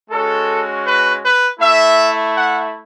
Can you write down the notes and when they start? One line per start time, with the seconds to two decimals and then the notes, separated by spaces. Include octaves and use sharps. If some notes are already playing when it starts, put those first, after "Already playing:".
0.10 G#3 C#4 F#4 A4
0.85 B4
1.22 B4
1.60 A3 E4 E5
2.34 F#5